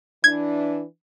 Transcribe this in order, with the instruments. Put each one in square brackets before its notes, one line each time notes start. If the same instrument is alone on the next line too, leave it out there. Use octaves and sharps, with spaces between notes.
[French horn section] E3 D4 [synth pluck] G#6